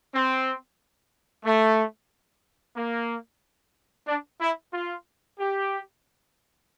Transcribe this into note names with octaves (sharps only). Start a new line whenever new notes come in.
C4
A3
A#3
D4
E4
F4
G4